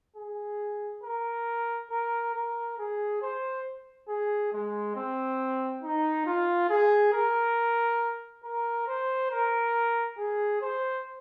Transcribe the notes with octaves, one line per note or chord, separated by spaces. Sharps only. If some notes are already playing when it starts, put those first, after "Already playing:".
G#4
A#4
A#4
A#4
G#4
C5
G#4
G#3
C4
D#4
F4
G#4
A#4
A#4
C5
A#4
G#4
C5